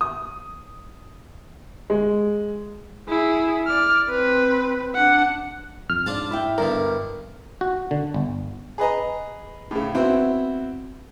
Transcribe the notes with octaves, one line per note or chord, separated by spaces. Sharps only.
D#6
G#3
E4 G#4
D5 F6
C4 B4
D4 F#5
F2 F6
G#2 D4 F4 A5
E4 E5 G5
G2 B2 D3 A#4
F#4
D3
G1
G#4 B4 D#5 A#5
A2 C#3
B3 C4 E4 F#4